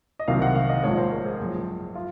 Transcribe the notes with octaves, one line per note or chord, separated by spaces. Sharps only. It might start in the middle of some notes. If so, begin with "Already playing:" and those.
D#5
C2 C3 D#3 F#3 F5
F#5
F5
D#5
A#1 G#2 F3 C#5
C5
A#4
G#4
F#1 F#2 F3
F4